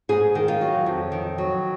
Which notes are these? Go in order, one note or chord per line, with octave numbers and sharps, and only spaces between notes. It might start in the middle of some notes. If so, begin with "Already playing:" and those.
G#2 G#4
D#3
F4
F#3
F2
D#3
F#3